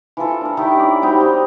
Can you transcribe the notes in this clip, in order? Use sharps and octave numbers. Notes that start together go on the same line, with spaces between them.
E3 F4 A4
D4 A#4
D#3 D#4 E4 G4
C#4 D5
G3 C4 D#4 F#4
D#4 G4